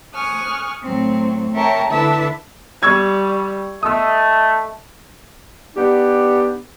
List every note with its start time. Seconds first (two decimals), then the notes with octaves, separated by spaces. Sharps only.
0.15 G#5 C#6 D#6 F6 F#6
0.83 A2 F#3 C4
1.54 A#4 C#5 E5 G5 A5 A#5
1.90 D3 D4 E4 B4 E5 A5
2.83 G3 C#6 E6 G#6
3.83 A3 D#5 D#6 E6
5.76 B3 D4 D#4 G4